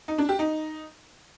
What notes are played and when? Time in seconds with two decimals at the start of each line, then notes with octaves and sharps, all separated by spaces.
0.08 D#4
0.18 D4
0.29 G4
0.39 D#4